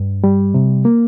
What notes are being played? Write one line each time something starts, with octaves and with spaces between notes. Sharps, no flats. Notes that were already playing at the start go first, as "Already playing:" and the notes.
Already playing: G2
G3
C3
A#3